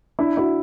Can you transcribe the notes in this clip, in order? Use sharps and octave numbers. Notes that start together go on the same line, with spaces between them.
D4 E4
E4 F#4